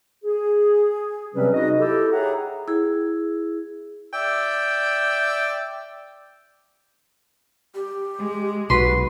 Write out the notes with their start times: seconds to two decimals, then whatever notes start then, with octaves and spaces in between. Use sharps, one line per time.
0.24 G#4
1.34 C3 F#3 G3 C4 C#4 B4
1.53 D#4 F#4 G#4 D#5
1.79 E4 G4 A4
2.12 G#4 C#5 E5 F#5 G5 A#5
2.68 E4 G#4
4.13 D5 E5 G5
7.75 G4
8.19 G#3
8.70 B1 F#4 B4 C6